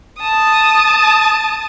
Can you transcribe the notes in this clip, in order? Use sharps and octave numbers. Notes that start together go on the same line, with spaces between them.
A5 D#6